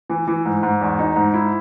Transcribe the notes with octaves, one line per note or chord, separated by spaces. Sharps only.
E3
E3
G#2
G#2
E2
D#4
G#2
E4